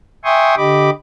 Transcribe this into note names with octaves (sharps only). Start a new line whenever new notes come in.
E5 G5 G#5 C6 C#6 D#6
D3 G4 D#5 B5 D6